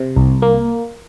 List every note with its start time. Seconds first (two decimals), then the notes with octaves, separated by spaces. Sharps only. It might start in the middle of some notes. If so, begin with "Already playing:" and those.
Already playing: C3
0.16 C2
0.42 A#3